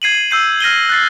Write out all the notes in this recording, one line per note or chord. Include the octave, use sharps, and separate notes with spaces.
G#6 C7 D#7 F#7
E6 G6 C7 D#7
F6 A#6 D#7 G7
F#6 A6 C7